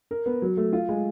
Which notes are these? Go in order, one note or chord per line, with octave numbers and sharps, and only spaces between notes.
A#4
B3
F#3
A3
F4
G#3